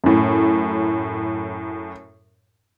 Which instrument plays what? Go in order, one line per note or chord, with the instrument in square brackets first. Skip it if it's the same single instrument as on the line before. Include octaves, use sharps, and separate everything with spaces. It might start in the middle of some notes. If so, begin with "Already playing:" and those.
[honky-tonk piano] F#2 A2